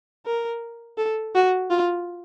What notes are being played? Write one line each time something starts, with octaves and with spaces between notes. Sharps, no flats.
A#4
A4
F#4
F4